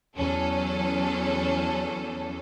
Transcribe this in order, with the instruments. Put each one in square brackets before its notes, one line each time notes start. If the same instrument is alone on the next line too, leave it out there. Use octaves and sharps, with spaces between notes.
[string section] E2 F#3 C#4 A4